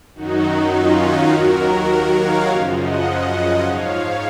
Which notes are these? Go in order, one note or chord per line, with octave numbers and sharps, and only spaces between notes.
F#2 D#3 F#3 D#4 F#4
C#4 F4
D#4 F#4
D#2 D#3 F#3 F#4 A#4
F#4 A#4
C#5 F5
F#2 C#3 F3 F5 G#5
D#5 F#5
D#5 F#5
G#2 F3 C#5 F5